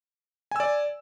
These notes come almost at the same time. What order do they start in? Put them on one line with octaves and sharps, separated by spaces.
G#5 E6 D5